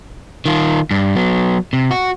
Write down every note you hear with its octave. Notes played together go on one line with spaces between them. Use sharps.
D#3 F4
G2
F#3 B3
C3
F#4